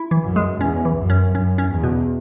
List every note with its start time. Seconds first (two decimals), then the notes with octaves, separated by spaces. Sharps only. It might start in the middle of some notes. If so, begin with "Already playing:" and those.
Already playing: E4
0.11 E3
0.24 F#2
0.36 G#3
0.61 E2 C#4
0.85 E3
0.98 F#2
1.10 C#4
1.35 F#2 C#4
1.58 C#4
1.71 E2
1.84 B2